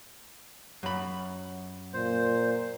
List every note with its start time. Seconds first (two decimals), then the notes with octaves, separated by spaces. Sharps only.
0.83 F#2 B5
1.93 A#2 C5